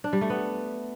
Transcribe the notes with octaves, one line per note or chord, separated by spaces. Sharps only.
D4
G3
A3
B3